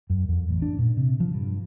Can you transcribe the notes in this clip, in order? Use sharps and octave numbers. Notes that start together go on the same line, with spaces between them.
F#2
F2
A1
D4
A#2
C3
F3
G2